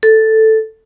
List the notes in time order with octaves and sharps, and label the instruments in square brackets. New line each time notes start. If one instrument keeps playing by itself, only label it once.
[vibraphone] A4